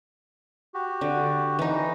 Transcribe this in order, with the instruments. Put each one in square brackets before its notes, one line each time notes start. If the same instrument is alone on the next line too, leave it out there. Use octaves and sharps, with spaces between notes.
[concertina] F#4 G4
[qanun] D3
E3 D#4